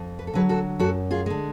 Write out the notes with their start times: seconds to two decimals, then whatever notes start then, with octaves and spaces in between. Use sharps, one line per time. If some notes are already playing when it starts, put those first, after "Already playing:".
Already playing: F2
0.19 B4
0.27 A4
0.34 D3 F#3 G#4 B4
0.49 F#4 A4
0.79 F#2 F#4 A4
1.11 F4 G#4
1.26 D3 G#3